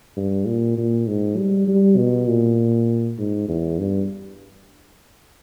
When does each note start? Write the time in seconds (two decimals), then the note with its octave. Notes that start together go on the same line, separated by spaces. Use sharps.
0.16 G2
0.47 A#2
0.77 A#2
1.07 G#2
1.37 G3
1.67 G3
1.98 B2
2.28 A#2
3.18 G#2
3.48 E2
3.79 G2